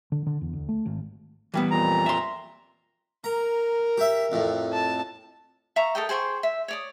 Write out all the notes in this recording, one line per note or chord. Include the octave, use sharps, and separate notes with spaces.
D3
D3
E2
D2
A3
G#1
E3 G3 B3
F2 A#2 A#5
E5 C6
A#4 A#5
G4 E5
F2 A2
A5
E5 F5 A#5 C#6
A4 A#4 D#5 G5
G#4 C5 G5 C#6
E5
C#5 D5 D#6